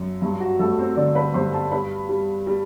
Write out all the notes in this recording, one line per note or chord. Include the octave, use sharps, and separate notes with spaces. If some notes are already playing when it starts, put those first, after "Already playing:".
Already playing: F#2
G2
F#4
G2 A3 A4
C4 C5
D3 D4 D5
B4 B5
G2 C5 C6
A4 A5
G3 B4 B5
G3
G3